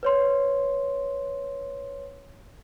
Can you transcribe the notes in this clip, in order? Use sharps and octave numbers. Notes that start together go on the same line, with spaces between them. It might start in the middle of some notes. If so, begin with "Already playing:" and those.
B4 C#5 C6